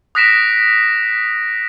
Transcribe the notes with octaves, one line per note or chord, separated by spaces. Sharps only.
D#6 F#6 A#6 B6 D7 E7